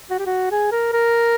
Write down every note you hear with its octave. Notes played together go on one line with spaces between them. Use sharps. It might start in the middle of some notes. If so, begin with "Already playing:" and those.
F#4
G4
F#4
G#4
A#4
A#4